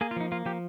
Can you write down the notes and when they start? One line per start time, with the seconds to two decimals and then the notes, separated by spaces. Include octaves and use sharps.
0.01 A#3 G#4
0.11 F4
0.16 F3 D#4
0.32 A#3 F4
0.45 F3 G4